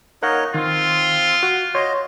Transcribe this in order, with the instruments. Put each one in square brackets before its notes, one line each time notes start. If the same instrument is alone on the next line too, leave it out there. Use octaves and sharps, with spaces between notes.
[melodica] D#4 C#5 D#5 [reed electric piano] A#4 F5 F#5
[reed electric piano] D#3 [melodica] C4 [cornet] F4
[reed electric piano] F#4
[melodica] F#4 D#5 [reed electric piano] C#5 C6